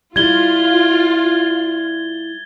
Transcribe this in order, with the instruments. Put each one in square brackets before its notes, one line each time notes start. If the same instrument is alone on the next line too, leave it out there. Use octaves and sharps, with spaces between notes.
[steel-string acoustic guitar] G3 E4 [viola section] F4 [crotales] G#6 A6 G7